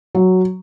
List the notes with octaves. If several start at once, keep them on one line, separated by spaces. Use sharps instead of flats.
F#3